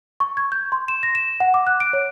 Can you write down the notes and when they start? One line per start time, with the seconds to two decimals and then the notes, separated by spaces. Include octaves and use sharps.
0.20 C#6
0.37 G#6
0.52 G6
0.72 C6
0.88 E7
1.03 A#6
1.15 E7
1.40 F#5
1.54 D6
1.67 F#6
1.80 D7
1.93 C#5